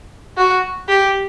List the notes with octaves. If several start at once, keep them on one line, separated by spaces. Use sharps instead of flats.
F#4
G4